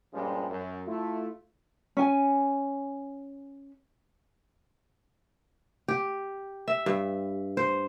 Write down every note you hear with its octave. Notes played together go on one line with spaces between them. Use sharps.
G2 A#2 F3 G3 G#3 C#4
F#2
A3 E4 F4
C#4 G#5
G4
E5
G2
C5